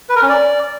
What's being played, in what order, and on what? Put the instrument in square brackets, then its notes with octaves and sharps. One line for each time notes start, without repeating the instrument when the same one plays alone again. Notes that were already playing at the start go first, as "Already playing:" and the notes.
[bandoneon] B4
A#4
C#4
D5